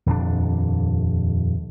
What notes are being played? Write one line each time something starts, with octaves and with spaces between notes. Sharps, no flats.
D#1 F2 C#4 D4